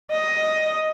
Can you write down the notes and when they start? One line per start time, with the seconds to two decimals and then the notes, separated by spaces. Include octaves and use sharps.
0.11 D#5